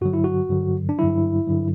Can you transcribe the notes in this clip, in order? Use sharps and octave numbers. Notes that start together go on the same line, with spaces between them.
G2 D3 F#3 F#4
E4
F#4
G2 D3 F#3
D4
G2 D3 F#3 E4
G2 D3 F#3